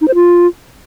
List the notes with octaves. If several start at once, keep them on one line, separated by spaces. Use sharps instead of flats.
D#4
C5
F4